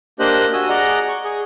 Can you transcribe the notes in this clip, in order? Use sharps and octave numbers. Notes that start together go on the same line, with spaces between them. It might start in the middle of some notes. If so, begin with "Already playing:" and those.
A#3 D4 G4 C5 D#5 F#6
F#4 G#5 D#6 E6
G#4 D5 D#5 F#5 A#5
C#6
G#4